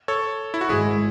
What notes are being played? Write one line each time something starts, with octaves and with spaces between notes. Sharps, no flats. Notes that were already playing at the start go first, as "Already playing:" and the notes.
A4 C#5
E4
F#4
G#1 G#2 G#3 E4 G#4